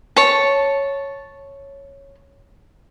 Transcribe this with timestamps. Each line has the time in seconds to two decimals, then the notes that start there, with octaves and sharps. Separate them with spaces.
0.16 C#5 A5